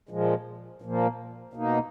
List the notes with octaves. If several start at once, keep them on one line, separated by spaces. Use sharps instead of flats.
A#2 F3 G#3
A#2 F3 A#3
B2 A#3 D#4